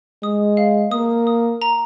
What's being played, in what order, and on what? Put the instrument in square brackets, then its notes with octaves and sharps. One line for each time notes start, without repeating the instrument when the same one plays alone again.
[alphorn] G#3 [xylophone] D#6
[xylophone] F5
[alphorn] A#3 [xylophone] D#6
[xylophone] D#6
A#5